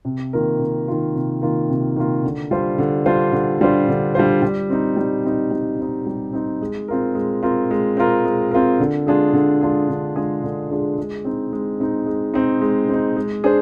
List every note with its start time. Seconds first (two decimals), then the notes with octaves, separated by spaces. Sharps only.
0.05 C3
0.33 D#3 A#3 F4 A#4
0.59 C3
0.87 D#3 A#3 F4 A#4
1.15 C3
1.41 D#3 A#3 F4 A#4
1.70 C3
1.96 D#3 A#3 F4 A#4
2.24 D3
2.51 G3 D4 F4 C5
2.78 D3
3.06 G3 D4 F4 C5
3.32 D3
3.61 G3 D4 F4 C5
3.88 D3
4.15 G3 D4 F4 C5
4.42 G3
4.70 C4 D#4
4.97 G3
5.25 C4 D#4
5.51 G3
5.79 C4 D#4
6.07 G3
6.33 C4 D#4
6.61 G#3
6.88 C4 F4 A#4
7.15 G#3
7.43 C4 F4 A#4
7.71 G#3
7.97 C4 F4 A#4
8.25 G#3
8.51 C4 F4 A#4
8.80 D3
9.07 G#3 D4 F4 G#4
9.33 D3
9.61 G#3 D4 F4 G#4
9.89 D3
10.16 G#3 D4 F4 G#4
10.43 D3
10.71 G#3 D4 F4 G#4
10.98 G#3
11.25 C4 D#4
11.53 G#3
11.80 C4 D#4
12.06 G#3
12.34 C4 D#4
12.61 G#3
12.89 C4 D#4
13.16 G#3
13.44 D4 G#4 C5